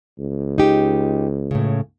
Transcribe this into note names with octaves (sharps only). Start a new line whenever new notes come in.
C#2
D#4 G4
A2 C#3